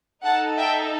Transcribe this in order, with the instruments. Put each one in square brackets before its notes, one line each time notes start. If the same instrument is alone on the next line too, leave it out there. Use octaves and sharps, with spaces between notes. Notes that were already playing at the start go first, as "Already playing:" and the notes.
[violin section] D#4 A4 F#5 A5
E5 G5